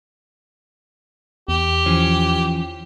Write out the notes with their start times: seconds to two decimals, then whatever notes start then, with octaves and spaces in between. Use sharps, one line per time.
1.48 E2 G4
1.86 E3 F3 C#4